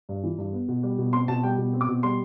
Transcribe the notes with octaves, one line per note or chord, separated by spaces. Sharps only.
G2
E3
G2
B3
B2
G3
B2
C4 C6
B2 A5
G3 G5
B2
C4
D6
B2
G3 C6